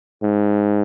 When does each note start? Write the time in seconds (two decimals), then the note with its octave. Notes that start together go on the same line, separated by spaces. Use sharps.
0.23 G#2